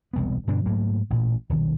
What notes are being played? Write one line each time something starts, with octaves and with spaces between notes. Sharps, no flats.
E1 C2 B3
G2 B2 D3 D4
G#2 F#3 A3 A#3
A1 A#2
D#1 B1 D#3